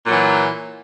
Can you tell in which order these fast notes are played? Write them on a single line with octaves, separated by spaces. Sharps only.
A#2 F#3 E3